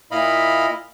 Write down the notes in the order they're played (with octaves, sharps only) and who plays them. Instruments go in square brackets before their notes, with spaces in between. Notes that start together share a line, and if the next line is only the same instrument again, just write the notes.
[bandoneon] A#2 E4 D#5 F5 B5